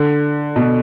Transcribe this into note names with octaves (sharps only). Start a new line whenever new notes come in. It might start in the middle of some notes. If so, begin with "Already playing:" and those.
Already playing: D3
B2